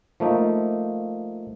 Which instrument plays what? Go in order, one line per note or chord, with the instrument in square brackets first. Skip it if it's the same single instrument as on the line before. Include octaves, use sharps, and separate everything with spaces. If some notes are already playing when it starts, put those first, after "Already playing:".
[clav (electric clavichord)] F3 A3 A#3 D#4